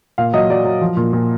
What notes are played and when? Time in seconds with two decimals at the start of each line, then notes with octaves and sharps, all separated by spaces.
0.18 A#2 F5
0.33 F#3 D#5
0.50 F#3 D5
0.65 F#3
0.81 F3
0.97 A#2
1.13 A#2